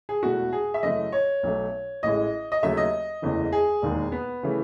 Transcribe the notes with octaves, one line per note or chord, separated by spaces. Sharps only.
G#4
E1 E2 B2 A3 F#4
G#4
E5
F#2 C#3 E3 A3 D#5
C#5
B1 B2 F#3 A3
A1 A2 G#3 D#5
D#5
D#2 C#3 F#3 A3 E5
D#5
F#1 E2 C#3 E3 A3
G#4
E1 D#2 D#3 G#3
B3
C#3 E3 A3